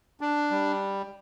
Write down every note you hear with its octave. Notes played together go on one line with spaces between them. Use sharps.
D4
G3